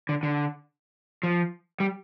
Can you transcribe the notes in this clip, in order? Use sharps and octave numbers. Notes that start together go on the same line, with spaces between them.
D3
D3
F3
G3